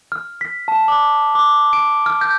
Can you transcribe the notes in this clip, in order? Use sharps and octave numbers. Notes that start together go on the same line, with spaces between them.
F6
B6
A5
D6
D6
D7
F6
G6